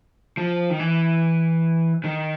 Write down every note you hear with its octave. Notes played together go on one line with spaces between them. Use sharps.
F3
D#3
E3
D#3